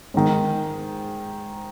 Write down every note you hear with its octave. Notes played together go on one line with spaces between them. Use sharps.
G#2 D#3